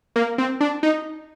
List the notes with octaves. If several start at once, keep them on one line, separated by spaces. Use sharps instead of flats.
A#3
C4
D4
D#4